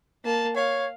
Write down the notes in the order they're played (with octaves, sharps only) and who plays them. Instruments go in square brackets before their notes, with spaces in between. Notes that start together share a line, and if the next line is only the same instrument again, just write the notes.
[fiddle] A#3 A5
[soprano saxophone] C#5 [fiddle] F5